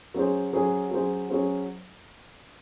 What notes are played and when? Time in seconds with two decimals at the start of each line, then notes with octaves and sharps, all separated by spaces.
0.14 F#3 C#4 G#4 C5
0.53 F#3 C#4 G#4 C5
0.91 F#3 C#4 G#4 C5
1.30 F#3 C#4 G#4 C5